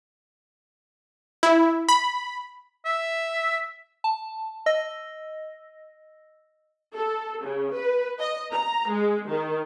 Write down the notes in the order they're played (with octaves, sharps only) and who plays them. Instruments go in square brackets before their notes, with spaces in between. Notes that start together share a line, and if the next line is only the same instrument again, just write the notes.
[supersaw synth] E4
B5
[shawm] E5
[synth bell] A5
D#5 E6 A#6
[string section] A4
C#3
B4
D#5
A#5
G#3
D#3